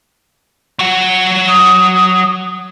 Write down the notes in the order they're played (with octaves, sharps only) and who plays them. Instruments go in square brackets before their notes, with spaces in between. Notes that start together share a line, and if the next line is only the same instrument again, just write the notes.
[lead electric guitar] F#3 F#5
[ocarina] D#6